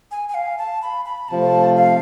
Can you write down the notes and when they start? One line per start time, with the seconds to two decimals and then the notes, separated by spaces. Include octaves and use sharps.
0.11 G#5
0.29 G#5
0.34 F5
0.58 A5
0.82 B5
1.05 B5
1.28 C3 F3 A3 A5
1.76 F5